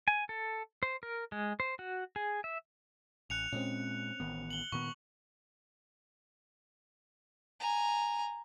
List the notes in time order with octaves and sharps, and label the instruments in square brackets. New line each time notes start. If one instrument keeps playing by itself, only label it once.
[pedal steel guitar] G#5
A4
C5
A#4
G#3
C5
F#4
G#4
E5
[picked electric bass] A1 [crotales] F#6 C#7 F7
[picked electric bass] A#2 G#3 [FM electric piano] C4 C#4
[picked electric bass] A1 D#3 B3
[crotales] F#7 G7
[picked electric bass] A#2 D#3 B3 [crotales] C#6
[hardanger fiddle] G#5 A#5